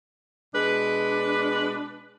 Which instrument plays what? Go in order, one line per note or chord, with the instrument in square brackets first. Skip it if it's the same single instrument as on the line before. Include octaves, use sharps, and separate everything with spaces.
[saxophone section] B2 G#3 D4 B4